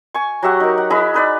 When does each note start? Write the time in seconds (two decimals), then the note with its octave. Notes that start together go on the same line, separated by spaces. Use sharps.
0.14 G#5 C#6
0.42 F#3 G4 E5 F#5
0.60 D#4 A#4
0.78 F#5
0.90 E4 G#4 D#5 B5
1.14 D#4 B4 D5